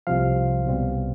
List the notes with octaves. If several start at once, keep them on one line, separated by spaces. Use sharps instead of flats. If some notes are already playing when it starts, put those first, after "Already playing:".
C2 C3 F3 F5
C2 B2 G3 C4